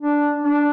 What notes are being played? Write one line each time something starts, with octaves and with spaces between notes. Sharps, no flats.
D4
D4